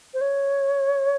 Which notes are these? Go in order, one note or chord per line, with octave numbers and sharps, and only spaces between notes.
C5
C#5